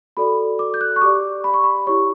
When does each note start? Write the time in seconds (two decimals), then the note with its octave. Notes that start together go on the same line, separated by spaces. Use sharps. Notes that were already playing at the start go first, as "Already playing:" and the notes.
0.17 F#4 A4 D5 B5
0.59 D6
0.74 G6
0.81 F#6
0.96 C#6
1.01 G4 D5 D6
1.44 B5
1.54 C#6
1.64 B5
1.86 E4 G4 C#5 C#6